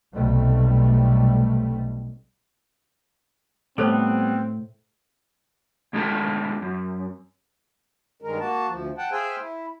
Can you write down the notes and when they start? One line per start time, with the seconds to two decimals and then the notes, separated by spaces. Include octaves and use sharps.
0.14 B1 C3 G3 A3
3.78 A2 G3 B3 C4 A4 C5 C#5
5.93 G#2 G#3 D4 F4 A4 A5
6.62 F#2
8.22 G2 D#3 G#3 A#4
8.39 A#3 F#4 A5
8.68 D2 F3
8.98 F#5 G5 A5
9.12 G#4 C5 E5 F5 G5 G#5
9.37 E4